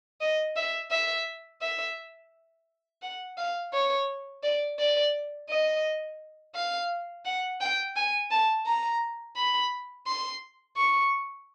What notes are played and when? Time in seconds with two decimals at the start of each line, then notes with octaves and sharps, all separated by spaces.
0.21 D#5
0.56 E5
0.91 E5
1.62 E5
3.02 F#5
3.38 F5
3.73 C#5
4.44 D5
4.79 D5
5.49 D#5
6.55 F5
7.25 F#5
7.60 G5
7.96 G#5
8.31 A5
8.66 A#5
9.37 B5
10.07 C6
10.77 C#6